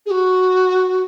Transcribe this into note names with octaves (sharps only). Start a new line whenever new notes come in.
G#4
F#4